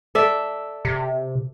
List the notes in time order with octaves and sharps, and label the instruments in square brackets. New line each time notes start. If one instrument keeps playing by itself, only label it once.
[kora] A4 D5 E5
[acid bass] C3